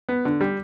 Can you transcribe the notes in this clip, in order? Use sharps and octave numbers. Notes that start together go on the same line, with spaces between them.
B3
D3
G3